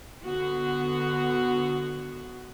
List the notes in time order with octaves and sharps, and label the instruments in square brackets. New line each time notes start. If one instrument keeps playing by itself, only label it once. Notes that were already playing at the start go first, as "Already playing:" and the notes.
[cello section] D3 B3 F#4